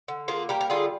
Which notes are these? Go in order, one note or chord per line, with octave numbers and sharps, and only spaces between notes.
D3
A#3 F4 G#4
G3 G4 A#4
A#4
D3 F4 G#4